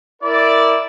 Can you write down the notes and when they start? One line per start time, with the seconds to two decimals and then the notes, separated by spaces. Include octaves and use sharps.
0.22 E4 A#4 D5